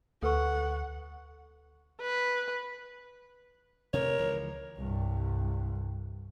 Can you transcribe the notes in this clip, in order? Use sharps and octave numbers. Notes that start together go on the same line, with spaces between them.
D2 A4 B4 F#5 C#6
B4
C3 A3 A#4 C#5
C#2 E3 F3
C2 G2